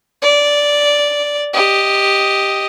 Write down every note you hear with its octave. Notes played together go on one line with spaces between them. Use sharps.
D5
G4 D#5